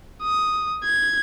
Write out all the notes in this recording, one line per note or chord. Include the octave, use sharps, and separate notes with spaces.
D#6
G#6